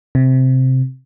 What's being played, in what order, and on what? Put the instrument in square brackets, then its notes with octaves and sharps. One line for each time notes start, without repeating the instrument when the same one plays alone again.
[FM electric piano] C3